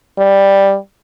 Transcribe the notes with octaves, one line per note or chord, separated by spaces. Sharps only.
G3